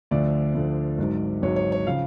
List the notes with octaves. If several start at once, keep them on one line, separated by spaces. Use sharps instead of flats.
D2 D3 F3 D5
D2 D3 F3
G#1 G#2 F#3
G#1 G#2 F#3 C#5
C#5
C#5
C#3 F3 F5